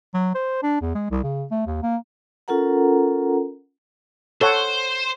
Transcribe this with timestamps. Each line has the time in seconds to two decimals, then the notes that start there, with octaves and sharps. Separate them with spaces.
0.14 F#3
0.35 C5
0.63 D4
0.81 E2
0.95 G#3
1.11 C2
1.23 C#3
1.51 A3
1.67 D#2
1.83 A#3
2.48 C#4 F4 A4 A#4 F#5 A#5
4.41 A4 C5 C#5 F#5